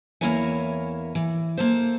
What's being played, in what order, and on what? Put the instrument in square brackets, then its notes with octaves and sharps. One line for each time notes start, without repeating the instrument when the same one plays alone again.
[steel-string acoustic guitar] E2 A#3 E4 A#4 C#5 G#5
E3
A#3 A4 C5